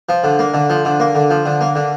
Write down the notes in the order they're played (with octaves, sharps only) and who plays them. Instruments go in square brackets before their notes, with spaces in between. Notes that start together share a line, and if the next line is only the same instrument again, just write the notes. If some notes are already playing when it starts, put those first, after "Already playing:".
[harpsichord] F3
D3
A#3
D3
F3
D3
A#3
D3
F3
D3
A#3
D3